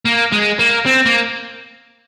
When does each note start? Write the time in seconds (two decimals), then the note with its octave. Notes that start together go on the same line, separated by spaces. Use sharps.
0.05 A#3
0.32 G#3
0.59 A#3
0.86 C4
1.06 A#3